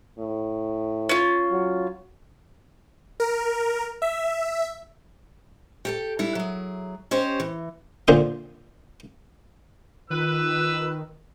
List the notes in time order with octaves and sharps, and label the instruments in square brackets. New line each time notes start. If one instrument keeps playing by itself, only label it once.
[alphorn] A2
[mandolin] C#4 F4
[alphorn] F#3
[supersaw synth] A#4
E5
[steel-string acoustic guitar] G4 A4 G5
G3 D4 E4
F#3 G#4
C#4 G4 C5 C#5 D#5
E3
[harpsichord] A#2 D3 C5 D#6
[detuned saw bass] D#3 [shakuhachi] F4 [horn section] B4 [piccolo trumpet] E6